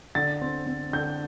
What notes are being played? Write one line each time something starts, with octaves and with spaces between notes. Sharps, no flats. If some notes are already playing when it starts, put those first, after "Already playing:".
D3 A6
C4
C4
D3 G6